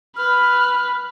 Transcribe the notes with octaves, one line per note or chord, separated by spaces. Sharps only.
B4 F6